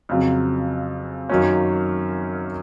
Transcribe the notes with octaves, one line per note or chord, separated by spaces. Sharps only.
F2 C#3 F#3
F#2 D#3 F#3 A#3 C#4